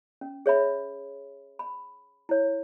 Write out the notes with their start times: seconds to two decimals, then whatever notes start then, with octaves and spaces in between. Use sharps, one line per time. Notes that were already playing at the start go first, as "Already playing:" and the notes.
0.21 C#4
0.46 G#4 C#5 E5 B5
1.59 B5
2.29 E4 C#5